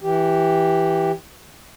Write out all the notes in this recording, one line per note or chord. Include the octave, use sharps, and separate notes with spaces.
E3 G4